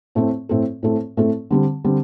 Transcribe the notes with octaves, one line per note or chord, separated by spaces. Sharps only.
A2 A3 C4 A4
A2 A3 C4 A4
A2 A3 C4 A4
A2 A3 C4 A4
D3 G3 C4
D3 G3 C4